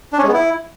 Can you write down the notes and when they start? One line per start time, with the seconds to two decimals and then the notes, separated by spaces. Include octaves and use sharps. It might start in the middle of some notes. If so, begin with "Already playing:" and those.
0.13 D4
0.18 C#4
0.23 G#3
0.28 B3
0.34 E4